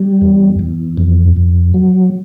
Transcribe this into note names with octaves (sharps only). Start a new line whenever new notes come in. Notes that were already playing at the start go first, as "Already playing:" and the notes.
Already playing: G3
E2
E2
F2
F2
F#3